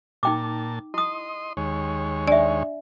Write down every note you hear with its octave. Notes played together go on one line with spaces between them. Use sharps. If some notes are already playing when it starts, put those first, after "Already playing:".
A#2 D#4 G5 A5 D6
E4 D#5 C6 D#6
D#2 G#3 C#5
D4 D5 E5